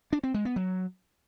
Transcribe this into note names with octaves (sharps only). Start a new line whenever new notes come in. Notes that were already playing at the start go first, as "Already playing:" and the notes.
D4
C4
G#3
B3
F#3